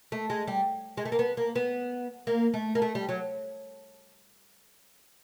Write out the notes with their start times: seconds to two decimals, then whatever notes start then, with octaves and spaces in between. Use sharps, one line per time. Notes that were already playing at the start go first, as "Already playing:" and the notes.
0.12 A3
0.30 G#3
0.48 G3
0.97 G#3
1.05 A3
1.12 A#3
1.19 B3
1.37 A#3
1.56 B3
2.27 A#3
2.54 A3
2.75 A#3
2.82 A3
2.95 G3
3.09 F#3